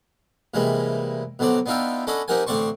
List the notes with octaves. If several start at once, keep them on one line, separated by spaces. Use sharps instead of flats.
C3 E3 G3 G#3 A#3
B2 D3 F#3 C4 D5
B3 D4 D#4 F4 E5 G5
C#4 D4 A4 D#5 F#5 B5
C4 D#4 G4 A#4 F#5 G#5
A1 D3 C4 D5 C6 C#6